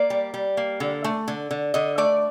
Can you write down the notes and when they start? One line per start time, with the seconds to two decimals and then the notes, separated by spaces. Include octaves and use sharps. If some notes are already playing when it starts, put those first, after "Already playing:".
Already playing: A#3 D5
0.10 G3
0.34 G3
0.57 A#3
0.80 D3
1.04 A3
1.28 D3
1.51 D3
1.74 D3 D#5
1.98 A3 D5